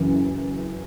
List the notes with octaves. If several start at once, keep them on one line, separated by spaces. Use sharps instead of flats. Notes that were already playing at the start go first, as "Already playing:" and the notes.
Already playing: F#2 C#3 E3